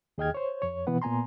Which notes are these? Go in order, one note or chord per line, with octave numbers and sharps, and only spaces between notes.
D#2 G#4 D#5 G5 F6 G#6
C5 C#5
F2 C#5
B2 E3 B3 B4 F#5
A#2 B3 G#5 A#5 C6